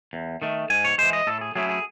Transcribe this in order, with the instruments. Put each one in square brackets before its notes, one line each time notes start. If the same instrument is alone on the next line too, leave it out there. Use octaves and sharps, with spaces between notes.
[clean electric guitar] E2
D#3 A3
G#2 G#5
C#5
E3 G#3 C5
D#5
A2 A4
G#4
F#3 A3 C#4 E4 G#4
G#4